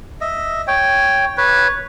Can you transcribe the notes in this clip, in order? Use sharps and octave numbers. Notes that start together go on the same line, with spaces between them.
D#5 E5
C#5 G5
B4 C#5